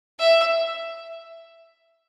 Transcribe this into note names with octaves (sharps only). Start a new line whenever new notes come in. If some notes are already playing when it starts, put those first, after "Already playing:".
E5